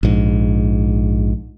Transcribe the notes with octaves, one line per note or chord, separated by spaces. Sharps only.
A#1 G#2